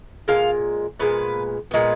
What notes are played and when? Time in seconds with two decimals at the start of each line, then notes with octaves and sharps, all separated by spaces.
0.28 A#2 G#3 F5
1.00 A#2 G#3 B3 B4
1.71 A#2 G#3 B3